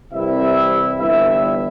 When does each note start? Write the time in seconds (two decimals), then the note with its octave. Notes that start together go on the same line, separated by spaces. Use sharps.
0.13 C2 C3 E3 E4 E5
0.99 G1 G2 E3 E4 E5